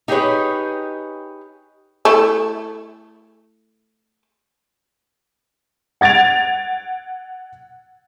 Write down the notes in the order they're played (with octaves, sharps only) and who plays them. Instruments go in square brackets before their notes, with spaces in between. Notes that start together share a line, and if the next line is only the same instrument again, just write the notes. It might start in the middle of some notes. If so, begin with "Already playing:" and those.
[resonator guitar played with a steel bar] D#4 G4 G#4 B4 C#5
[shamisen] A3 E4
[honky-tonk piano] F#5 G#6 A6 D7 F7